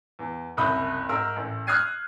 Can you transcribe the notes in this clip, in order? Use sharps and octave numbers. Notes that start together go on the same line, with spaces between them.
E2
F#1 C2 B5 D#6 G6
G#2 A#4 E6
A1
D#6 F6 F#6 G#6 C7 D#7